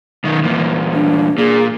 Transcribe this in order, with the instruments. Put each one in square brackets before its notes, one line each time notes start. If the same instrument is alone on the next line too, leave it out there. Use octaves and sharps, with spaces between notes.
[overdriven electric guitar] B1 D#3
E2 A#2
[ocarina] D4
[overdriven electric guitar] A#2 [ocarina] G#4